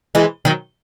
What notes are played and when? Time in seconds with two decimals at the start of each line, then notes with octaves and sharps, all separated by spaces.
0.15 E3 G#3
0.45 D#3 F#3